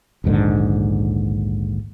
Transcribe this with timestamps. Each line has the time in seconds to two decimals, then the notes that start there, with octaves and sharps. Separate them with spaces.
0.24 A#1 D#2 G#2 D3